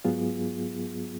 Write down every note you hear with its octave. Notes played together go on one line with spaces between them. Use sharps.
G#2 F#3 B3 F4 G#4